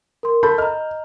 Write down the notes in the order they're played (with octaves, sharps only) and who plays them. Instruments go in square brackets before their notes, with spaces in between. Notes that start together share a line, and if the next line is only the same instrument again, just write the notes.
[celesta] A#4 C6
[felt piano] A4 B5 G6
[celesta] D#5 A#5 [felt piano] F6